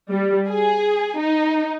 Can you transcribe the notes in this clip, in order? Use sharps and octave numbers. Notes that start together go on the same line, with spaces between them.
G3
G#4
D#4